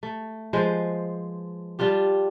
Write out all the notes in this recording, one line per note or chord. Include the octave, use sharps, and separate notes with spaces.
A3
F3 G#3 B4 C5
G3 D4 F4 G4